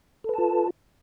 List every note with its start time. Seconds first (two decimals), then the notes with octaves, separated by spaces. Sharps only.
0.24 A4
0.29 B4
0.34 A5
0.38 F4